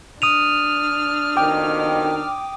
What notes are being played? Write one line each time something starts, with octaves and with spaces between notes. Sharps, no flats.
D4 D#6 F6 D#7 F7
F2 B2 D#3 G5 D6